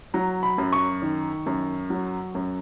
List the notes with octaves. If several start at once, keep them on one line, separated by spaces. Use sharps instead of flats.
F#3 A#5
B5
F#2
C#6
D#3
F#2
F#3
F#2